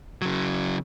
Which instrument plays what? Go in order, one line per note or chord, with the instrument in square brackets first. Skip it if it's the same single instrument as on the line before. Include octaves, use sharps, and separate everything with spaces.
[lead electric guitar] C#3 F#3